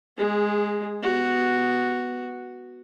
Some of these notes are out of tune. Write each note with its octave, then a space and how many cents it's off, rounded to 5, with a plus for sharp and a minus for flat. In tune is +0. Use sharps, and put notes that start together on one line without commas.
G#3 +0 G#4 -20
B3 +0 F#4 +0